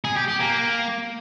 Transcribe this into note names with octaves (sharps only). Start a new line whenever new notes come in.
G#4
G4
G4
A#3